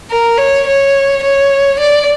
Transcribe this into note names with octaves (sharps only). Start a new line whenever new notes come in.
A#4
C#5
C#5
C#5
D5